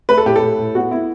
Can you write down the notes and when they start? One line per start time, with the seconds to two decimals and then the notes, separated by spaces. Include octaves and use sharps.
0.09 A3 B4
0.18 A4
0.26 A2 G4
0.36 A4
0.42 A2
0.58 A2
0.75 B3 F#4
0.91 B3 E4